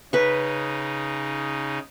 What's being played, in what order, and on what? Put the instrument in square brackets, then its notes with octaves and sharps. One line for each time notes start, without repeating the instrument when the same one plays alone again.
[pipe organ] C#3 D#4 [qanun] B4 C#6